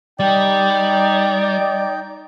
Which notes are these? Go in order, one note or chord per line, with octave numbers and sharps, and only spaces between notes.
G3 D#4 D5 G5